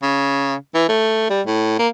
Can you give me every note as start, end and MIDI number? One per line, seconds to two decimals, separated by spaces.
0.03 0.55 49
0.75 0.86 52
0.89 1.28 57
1.30 1.42 55
1.47 1.79 45
1.79 1.88 58